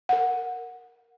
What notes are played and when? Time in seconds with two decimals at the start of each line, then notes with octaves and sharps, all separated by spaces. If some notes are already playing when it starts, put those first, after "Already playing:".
0.09 A#4 F#5